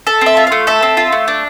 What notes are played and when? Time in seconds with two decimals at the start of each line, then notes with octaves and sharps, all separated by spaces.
0.07 A4 E5
0.21 C4 E5
0.37 F4
0.47 A3 F5
0.67 A4 E5
0.83 C4
0.97 F4
1.12 A3
1.28 D4